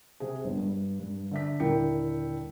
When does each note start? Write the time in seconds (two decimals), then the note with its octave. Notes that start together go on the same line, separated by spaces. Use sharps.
0.20 C3 G#4
0.44 G1
0.57 G2
1.00 G2
1.31 D3 E5 B6
1.60 D#1 D3 E4 A#4 G5 C#7